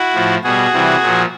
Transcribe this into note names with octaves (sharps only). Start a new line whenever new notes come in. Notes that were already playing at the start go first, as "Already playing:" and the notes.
Already playing: E4 F#4
A2 F3
B2 G3 F#4 G#4
C3 E3 G3
A#2 F3